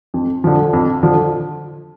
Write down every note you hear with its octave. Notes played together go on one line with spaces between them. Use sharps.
F2
D3 F3
F2
D3 F3